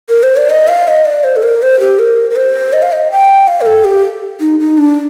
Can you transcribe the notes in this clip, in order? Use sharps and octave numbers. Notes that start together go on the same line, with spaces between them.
A#4
C5
D5
D#5
F5
D#5
D5
C5
A4
A#4
C5
G4
A#4
A#4
C5
D#5
F5
D#5
G5
F5
A#4
A4
G4
D#4
D#4
D4